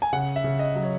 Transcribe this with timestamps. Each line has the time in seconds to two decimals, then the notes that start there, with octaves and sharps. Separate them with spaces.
0.02 G#5
0.13 C#3 F#5
0.36 E5
0.44 C#3
0.59 D#5
0.75 F#3
0.83 C#5